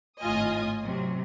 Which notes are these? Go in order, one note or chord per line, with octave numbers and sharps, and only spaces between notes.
G#1 A2 F4 D#5 G#5 D#6
C3 F#3